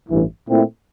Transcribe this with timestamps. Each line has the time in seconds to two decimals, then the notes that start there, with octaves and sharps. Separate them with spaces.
0.09 A1 G2 E3
0.47 A#2 A3 C4 E4